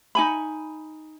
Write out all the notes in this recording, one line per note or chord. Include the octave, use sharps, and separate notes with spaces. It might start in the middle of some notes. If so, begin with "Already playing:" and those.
D#4 G#5 B5